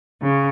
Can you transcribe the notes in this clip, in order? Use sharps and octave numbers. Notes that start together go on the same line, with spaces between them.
C#3